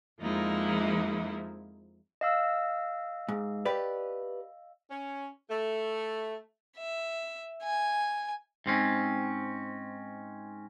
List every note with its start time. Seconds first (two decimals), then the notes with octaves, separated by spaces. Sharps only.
0.20 F2 F3 G#3 A#3 D#4 E4
2.21 D#5 F5 E6
3.28 G#2
3.65 G4 B4 D5
4.91 C#4
5.50 A3
6.77 E5
7.63 G#5
8.66 G#2 C4 C#4